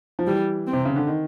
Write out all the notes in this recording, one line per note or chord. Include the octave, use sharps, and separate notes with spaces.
F3
E3 G3
C4
C3
C#3
D3
D#3